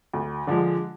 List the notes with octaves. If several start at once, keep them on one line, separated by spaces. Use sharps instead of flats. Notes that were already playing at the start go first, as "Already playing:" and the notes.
D2
D3 F3 G#3